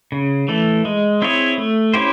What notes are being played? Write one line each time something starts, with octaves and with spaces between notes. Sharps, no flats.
C#3
E3 A3
G#3
C4 E4 G#4 C#5
A3
C#4 E4 G4 C5